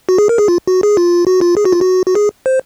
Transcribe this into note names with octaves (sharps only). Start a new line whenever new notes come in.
F#4
G#4
A#4
G#4
F4
F#4
G#4
F4
F#4
F4
G#4
F#4
F4
F#4
F#4
G#4
C5